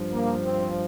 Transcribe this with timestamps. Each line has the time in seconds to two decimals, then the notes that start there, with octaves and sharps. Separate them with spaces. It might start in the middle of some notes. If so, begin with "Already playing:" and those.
Already playing: G2 F3
0.13 A#3
0.44 C4